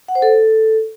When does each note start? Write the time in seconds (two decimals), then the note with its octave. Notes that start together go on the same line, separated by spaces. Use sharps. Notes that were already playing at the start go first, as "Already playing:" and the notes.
0.08 F#5
0.15 C5
0.22 A4